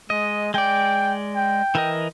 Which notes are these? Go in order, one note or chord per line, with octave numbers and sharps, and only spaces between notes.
G#3 D#5
G#3 D5 G5
G5
E3 A#4 D#5